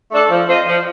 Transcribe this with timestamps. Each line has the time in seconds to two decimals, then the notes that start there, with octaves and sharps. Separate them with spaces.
0.10 A3 D4 A4 D5
0.29 F3
0.48 C4 F4 C5 D#5
0.66 F3